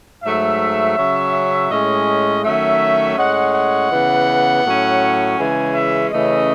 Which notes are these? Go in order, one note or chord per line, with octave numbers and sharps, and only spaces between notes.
G#2 F#3 A3 E5
C#3 F#3 C#4
A2 G#3 C#4 D#5
D#3 F#3 A3 C#4 E5
A2 G#3 C#4 F#5
F#5
C#3 E3 B3
A2 F#3 C#4
C#3 E3 G#3 C#4 G#5
E5
C#3 E3 A3 C#4 D#5